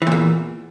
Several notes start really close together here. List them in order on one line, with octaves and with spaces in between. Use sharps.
E3 A#2 E2